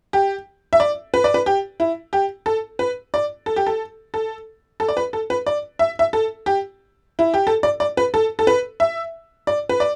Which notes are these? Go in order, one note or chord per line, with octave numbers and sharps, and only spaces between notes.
G4
E5
D5
B4
D5
B4
G4
E4
G4
A4
B4
D5
A4
G4
A4
A4
A4
D5
B4
A4
B4
D5
E5
E5
A4
G4
E4
G4
A4
D5
D5
B4
A4
A4
B4
E5
D5
B4
D5